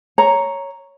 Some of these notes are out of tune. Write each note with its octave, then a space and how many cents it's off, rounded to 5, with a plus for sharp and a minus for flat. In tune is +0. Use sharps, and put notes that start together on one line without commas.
C#5 +0 A#5 +0